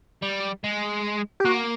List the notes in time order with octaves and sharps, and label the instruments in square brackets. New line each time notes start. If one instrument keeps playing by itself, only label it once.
[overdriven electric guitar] G3
G#3
[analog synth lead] G4
[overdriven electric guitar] A#3 [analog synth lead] F#4